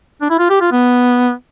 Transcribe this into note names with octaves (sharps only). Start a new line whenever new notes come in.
D4
E4
F4
G4
F4
B3